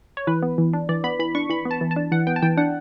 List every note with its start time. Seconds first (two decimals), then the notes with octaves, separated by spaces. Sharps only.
0.17 C#5
0.27 E3 B4
0.42 B3
0.58 E3
0.73 D4
0.89 E3 D5
1.04 B3 B5
1.19 E3 B5
1.35 D4 C#6
1.50 E3 B5
1.65 B3
1.71 A5
1.81 E3
1.91 A5
1.96 D4
2.12 E3 F#5
2.27 B3 G5
2.36 A5
2.42 E3 G5
2.58 D4 F#5